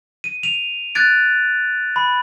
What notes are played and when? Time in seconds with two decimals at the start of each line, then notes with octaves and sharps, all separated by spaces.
0.24 D#7
0.43 D#7 F7
0.95 F#6 G#6 A6 D7
1.96 B5